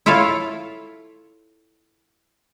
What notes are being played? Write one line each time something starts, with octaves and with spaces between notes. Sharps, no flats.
E4 F4 A4 C#5 F5